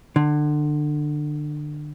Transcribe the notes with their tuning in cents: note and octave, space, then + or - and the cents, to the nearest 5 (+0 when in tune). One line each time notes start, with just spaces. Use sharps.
D3 +25